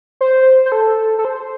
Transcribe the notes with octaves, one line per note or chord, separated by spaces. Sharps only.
C5
C5
A4
A4
C5